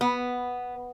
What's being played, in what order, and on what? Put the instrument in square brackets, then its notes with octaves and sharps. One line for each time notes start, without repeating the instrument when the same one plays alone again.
[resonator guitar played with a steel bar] B3